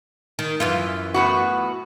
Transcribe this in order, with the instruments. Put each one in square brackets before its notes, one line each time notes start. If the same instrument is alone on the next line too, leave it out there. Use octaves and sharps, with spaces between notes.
[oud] D#3
F#2 E3 F4
[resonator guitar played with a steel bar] A2 B3 F#4